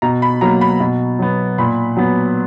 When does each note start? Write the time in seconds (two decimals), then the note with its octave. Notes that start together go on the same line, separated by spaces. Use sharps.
0.02 B2 A#5
0.22 B5
0.41 F#3 A#3 A#5
0.61 B5
0.80 B2
1.19 F#3 B3
1.58 A#2 B5
1.97 F#3 B3